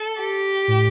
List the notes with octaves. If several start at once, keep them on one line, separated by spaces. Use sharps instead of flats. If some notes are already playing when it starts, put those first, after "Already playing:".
Already playing: A4
G4
A2